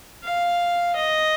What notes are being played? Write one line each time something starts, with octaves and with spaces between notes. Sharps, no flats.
F5
D#5